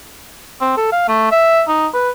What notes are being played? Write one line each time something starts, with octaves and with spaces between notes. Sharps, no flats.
C4
A4
F5
A3
E5
D#4
B4